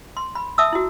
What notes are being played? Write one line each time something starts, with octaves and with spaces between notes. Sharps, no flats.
C6
B5
E5 A5 D#6 E6
E4 F#4